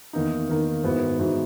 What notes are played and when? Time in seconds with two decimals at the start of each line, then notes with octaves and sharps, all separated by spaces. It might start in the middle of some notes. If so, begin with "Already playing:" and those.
0.13 E2 D#3 A#3 D#4
0.49 E2 D#3 A#3 D#4
0.84 G#2 E3 B3 F#4
1.19 G#2 E3 B3 F#4